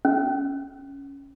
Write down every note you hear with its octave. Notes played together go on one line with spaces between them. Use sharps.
C#4